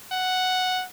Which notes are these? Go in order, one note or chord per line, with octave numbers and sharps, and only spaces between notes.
F#5